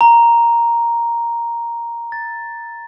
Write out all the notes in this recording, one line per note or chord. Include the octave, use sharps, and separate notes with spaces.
A#5
A6